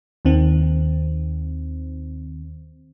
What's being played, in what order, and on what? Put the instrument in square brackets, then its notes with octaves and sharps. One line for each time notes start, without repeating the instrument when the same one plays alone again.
[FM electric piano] D#2 D#3 C4